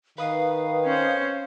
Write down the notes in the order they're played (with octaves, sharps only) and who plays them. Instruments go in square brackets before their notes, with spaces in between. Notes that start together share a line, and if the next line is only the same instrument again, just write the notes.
[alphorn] D#3 [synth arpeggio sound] B4 D#6 [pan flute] F5
[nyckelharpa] C#4 C5